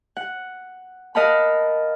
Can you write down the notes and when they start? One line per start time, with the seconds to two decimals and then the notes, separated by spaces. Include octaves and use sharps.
0.16 F#5
1.15 A#4 D#5 F5 F#5 A5 B5